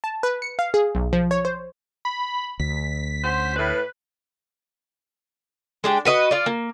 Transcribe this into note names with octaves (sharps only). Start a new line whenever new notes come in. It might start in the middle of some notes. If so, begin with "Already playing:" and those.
A5
B4
C#7
F5
G#4
B1
F3
C#5
C5
B5
D2 B6
C#4 F#4 C5
A2 B4
G#3 D4 G4
F#4 B4 D#5
F4 D5
A#3